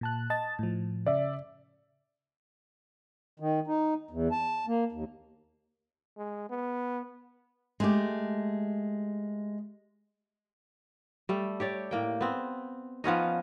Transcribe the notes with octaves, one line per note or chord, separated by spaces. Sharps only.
A#2 A5 F#6
D#5 A5 A6
A2 F3
C#3 D5 E5
D#3
D#4
E2
A5
A#3
D#2
G#3
B3
G#3 A3 G4
G3 A3
G4 C#5 D5
A2 A#3 G5
B3 C4
F3 B3 C#4 D#4